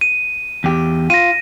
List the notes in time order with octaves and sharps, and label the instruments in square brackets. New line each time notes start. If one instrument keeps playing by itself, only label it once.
[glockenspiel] D#7
[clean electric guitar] E2 G4
[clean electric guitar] F4 [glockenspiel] A#6 D#7